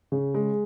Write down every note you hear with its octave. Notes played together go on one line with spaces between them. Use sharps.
C#3
G#3